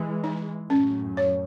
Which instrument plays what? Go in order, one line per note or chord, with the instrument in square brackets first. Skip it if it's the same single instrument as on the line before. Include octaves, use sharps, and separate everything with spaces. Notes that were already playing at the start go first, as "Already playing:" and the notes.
Already playing: [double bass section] E3 G#3
[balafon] D#4
[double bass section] F#2 A2 [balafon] C#4
[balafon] C#5